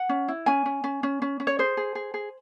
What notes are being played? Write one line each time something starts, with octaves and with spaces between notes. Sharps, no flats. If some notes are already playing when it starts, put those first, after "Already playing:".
Already playing: F#5
C#4
E4
C#4 G#5
C#4
C#4
C#4
C#4
C#4
C#5
G#4 C5
G#4
G#4
G#4